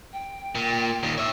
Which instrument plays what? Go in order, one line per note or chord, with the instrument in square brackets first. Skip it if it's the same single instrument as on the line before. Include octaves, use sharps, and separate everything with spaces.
[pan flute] G5
[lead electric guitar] A#2
D#2 A#2
C#5 E5